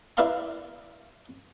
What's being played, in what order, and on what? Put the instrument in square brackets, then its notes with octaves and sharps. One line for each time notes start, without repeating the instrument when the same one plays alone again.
[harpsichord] E4 B4 D5 F5 A#5 C6